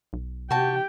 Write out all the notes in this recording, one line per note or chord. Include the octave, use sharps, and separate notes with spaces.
B1
C3 F#4 G4 G5 A5